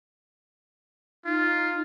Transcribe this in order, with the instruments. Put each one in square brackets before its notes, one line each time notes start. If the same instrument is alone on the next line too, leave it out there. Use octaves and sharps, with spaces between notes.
[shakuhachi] D#4 [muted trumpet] F4